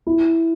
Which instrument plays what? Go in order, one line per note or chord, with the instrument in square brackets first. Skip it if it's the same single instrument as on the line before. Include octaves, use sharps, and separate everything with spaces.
[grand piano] E4